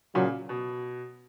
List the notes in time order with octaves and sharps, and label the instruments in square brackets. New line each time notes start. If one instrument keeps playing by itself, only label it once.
[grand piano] A#2 C#3 [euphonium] F#3
[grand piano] B2